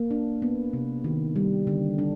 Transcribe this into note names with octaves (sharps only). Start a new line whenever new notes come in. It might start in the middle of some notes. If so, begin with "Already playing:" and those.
Already playing: A#3
D4
B3
C3
D#3
G3
D3
D4